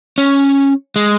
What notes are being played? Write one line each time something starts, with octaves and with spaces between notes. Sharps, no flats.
C#4
G#3